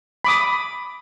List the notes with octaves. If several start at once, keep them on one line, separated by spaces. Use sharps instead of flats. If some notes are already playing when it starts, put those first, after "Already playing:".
B5 D6 D#6